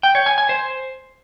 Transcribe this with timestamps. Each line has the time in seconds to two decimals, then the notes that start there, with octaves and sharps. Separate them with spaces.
0.03 G5
0.15 C#5
0.26 G#5
0.38 G#5
0.49 C5